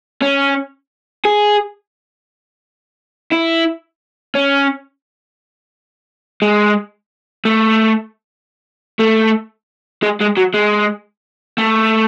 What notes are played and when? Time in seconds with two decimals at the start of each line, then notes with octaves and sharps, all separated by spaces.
0.22 C#4
1.25 G#4
3.32 E4
4.35 C#4
6.42 G#3
7.45 A3
9.00 A3
10.03 G#3
10.21 G#3
10.38 F#3
10.54 G#3
11.58 A3